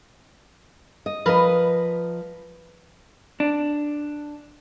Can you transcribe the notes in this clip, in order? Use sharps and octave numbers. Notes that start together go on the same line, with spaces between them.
D#5
F3 A#4 B4 D#5
D4